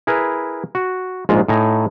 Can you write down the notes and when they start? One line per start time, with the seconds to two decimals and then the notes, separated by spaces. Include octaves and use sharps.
0.07 E4 G#4 A#4 B4
0.75 F#4
1.29 A#1 G#2 G#3 F4
1.48 A2 D#4 G#5 A#5